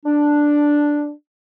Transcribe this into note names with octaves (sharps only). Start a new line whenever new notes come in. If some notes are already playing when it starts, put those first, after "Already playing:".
D4